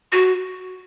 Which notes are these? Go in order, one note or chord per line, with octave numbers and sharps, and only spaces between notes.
F#4